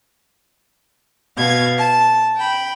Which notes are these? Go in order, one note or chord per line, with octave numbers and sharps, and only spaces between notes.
B2 F5 G#6
A5
G5 B5